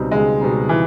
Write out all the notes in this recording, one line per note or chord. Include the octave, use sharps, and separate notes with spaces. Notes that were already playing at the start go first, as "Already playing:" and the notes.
Already playing: C#2 B2 G3 C4 D#4
C#2 G#3
B2 G3 C4 D#4
E3